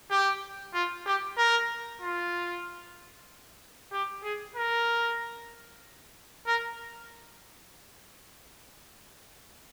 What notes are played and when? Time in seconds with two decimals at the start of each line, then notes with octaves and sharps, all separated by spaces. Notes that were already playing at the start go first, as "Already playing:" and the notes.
0.11 G4
0.74 F4
1.06 G4
1.38 A#4
2.02 F4
3.92 G4
4.24 G#4
4.56 A#4
6.47 A#4